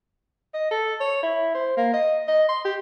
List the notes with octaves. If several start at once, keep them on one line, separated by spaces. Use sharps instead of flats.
D#5
A4
C#5
E4
C5
A#3
D#5
D#5
C6
G4